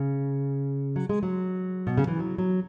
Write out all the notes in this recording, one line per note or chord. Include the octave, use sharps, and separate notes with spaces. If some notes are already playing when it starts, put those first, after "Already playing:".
Already playing: C#3
F#3
G#3
F#3
B2
C#3
E3
F#3
F#3